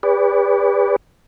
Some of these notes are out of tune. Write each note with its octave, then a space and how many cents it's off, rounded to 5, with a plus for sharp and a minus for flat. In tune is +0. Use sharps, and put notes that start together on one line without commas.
G4 +45 B4 +0 D5 -40